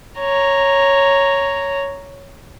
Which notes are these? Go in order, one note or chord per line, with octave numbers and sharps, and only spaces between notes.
C#5 A#5